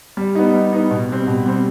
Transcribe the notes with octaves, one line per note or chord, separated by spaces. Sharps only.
G3
B3 D#4
G3
B3 D#4
B2
G3 C4
B2
G3 C4